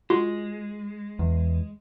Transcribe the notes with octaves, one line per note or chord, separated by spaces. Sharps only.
G#3 F4 F#4 C6
E2